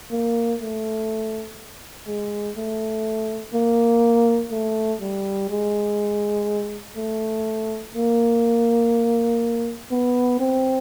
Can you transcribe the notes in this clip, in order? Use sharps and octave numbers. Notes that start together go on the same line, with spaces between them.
A#3
A3
G#3
A3
A#3
A3
G3
G#3
A3
A#3
B3
C4